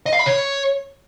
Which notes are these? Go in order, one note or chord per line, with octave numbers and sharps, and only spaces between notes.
D#5
F5
B5
C#5